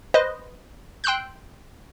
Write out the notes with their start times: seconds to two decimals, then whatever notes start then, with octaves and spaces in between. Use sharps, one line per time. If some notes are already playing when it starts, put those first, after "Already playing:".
0.14 B4 C5 D#5
1.04 G5 C6 E6 F#6 G6